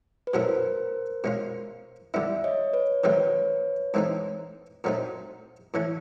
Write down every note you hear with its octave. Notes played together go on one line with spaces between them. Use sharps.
B4
B2 F#3 A3 C#4 E4 A#4 C5
B2 G#3 C#4 F4
D3 G3 B3 E4 D5 E5
C#5 D#5
B4 C#5
D#3 F#3 A3 C4 D#4 B4 C#5
G#2 E3 A3 C4 D#4
A#2 F#3 A3 C4 D#4
A2 E3 A3 C#4